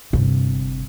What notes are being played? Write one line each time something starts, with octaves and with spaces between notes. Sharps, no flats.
G1 C3